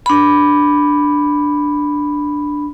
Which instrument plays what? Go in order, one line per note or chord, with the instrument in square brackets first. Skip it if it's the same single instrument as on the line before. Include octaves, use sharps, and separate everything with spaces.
[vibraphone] D4 B5